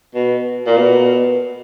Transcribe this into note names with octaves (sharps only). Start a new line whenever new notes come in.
B2
A#2
B2